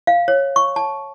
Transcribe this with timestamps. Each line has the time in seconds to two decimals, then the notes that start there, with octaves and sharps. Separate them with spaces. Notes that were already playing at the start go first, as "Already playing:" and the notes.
0.07 F5
0.28 C#5
0.56 C#6
0.76 A5